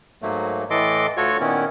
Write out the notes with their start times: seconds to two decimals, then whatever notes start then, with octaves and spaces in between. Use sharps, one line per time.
0.22 G#2 F#3 A3 A#3
0.70 A2 E3 A4 D#5 C6 D6
1.17 D2 F4 F#4 A4 C#5 C#6
1.40 A#2 D#3 B3 C#4 E4